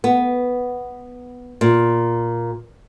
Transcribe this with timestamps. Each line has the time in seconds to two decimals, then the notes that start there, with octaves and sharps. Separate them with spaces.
0.04 B3
1.61 A#2